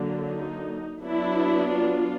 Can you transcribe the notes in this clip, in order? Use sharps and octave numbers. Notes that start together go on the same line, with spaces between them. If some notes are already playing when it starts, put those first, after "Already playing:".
Already playing: D3 F#3 A#3
D#4
F#3 B3 D4 E4
F4